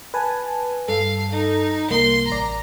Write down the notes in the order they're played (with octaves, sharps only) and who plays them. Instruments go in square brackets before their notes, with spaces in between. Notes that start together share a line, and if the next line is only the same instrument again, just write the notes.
[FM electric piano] B4 G#5 A5
[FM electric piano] G2 A4 [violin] F5
[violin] D#4
[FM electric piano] C2 A#3 [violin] C6
[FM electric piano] A1 D5 [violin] A#5